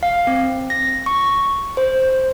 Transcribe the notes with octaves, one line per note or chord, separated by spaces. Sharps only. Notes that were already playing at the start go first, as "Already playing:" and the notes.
F5
C4
A#6
C#6
C5